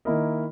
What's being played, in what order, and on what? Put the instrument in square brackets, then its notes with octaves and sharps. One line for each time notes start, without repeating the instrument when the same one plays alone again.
[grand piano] D#3 A#3 E4 A#4 D#5